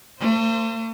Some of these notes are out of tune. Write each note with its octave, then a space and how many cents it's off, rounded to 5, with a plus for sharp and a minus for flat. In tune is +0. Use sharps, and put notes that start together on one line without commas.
A3 +45 C5 +0